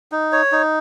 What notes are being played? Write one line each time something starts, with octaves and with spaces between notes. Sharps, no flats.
D#4
C#5
D#4